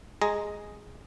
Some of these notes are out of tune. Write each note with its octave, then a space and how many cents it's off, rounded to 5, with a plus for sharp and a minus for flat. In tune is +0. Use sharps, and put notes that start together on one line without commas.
G#3 +0 G#4 +0 A#5 +0